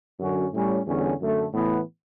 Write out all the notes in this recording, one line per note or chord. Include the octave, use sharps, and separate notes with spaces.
F#2 D3 F#3 C#4 F#4
A2 G3 C#4
E2 D3 G3 C#4
F#2 D3 A3
A2 E3 B3